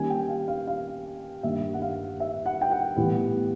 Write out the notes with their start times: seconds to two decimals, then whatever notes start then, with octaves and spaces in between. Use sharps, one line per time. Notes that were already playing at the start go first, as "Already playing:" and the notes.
Already playing: D#3 G3 A#3 C#4 G#5
0.10 G5
0.29 F5
0.48 F5
0.67 F5
1.43 G2 D#3 G3 A#3 D4 E5
1.74 F#5
1.82 F5
2.20 E5
2.46 F#5
2.61 G5
2.71 F#5
2.96 A2 E3 G3 B3